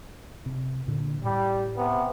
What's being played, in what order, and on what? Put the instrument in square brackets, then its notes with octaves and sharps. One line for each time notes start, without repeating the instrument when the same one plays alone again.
[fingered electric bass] C3
A#2 D3
[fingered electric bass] A2 [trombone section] G3
[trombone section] C3 B3